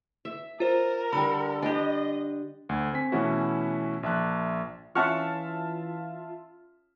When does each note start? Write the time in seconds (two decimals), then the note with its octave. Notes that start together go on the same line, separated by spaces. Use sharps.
0.25 E5
0.60 F4 A#4 C5
1.12 D3 G3 B5
1.62 D4 G4 D#5
2.69 D2 G#6
2.93 C4 G#5 B6
3.12 B2 E3 A3 C#4 E4 F#4
4.03 A#1 E5 A5 F#6
4.95 E3 C#4 F4 E5 F#5 A5 C#6 F6